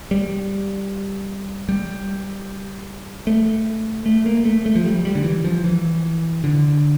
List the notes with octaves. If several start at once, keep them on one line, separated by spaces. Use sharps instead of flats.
G3
G3
A3
A3
A#3
A3
A3
F3
G3
G3
D3
E3
F3
E3
D3